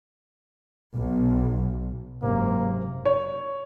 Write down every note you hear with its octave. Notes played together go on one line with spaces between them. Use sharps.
B1
F#1 G#2 C3 A#3
C#5